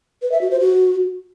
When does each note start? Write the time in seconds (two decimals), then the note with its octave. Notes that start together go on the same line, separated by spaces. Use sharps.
0.22 B4
0.32 E5
0.41 F#4
0.51 C5
0.60 F#4